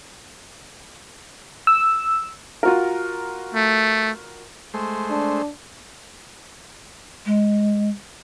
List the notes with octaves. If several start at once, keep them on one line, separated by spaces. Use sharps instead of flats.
E6
F4 F#4 A#4
A3
G#3 A3 C5
D4
G#3